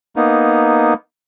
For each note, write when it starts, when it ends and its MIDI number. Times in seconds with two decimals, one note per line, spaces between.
0.16 0.94 58
0.16 0.94 59
0.16 0.94 63